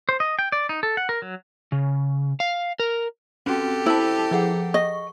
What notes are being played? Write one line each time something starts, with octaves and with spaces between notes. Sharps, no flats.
C5
D#5
G5
D5
D#4
A4
F#5
A#4
F#3
C#3
F5
A#4
C4 C#4 F#4 G4 A4
E4 C5 A5
F3 G#4 F#5
D#5 C#6